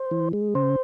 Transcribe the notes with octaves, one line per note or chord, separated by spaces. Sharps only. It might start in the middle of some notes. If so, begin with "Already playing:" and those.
Already playing: C5
E3
G#3
C#3 C5